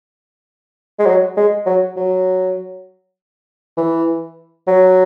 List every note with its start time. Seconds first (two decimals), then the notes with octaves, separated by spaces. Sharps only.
0.99 G#3
1.06 F#3
1.37 G#3
1.66 F#3
1.96 F#3
3.77 E3
4.67 F#3